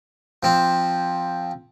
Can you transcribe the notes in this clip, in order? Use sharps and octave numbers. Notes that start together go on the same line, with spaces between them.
F3 C4